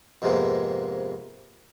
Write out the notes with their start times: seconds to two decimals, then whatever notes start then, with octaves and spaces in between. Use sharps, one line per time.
0.22 F2 G#2 C3 G#3 A#3 B3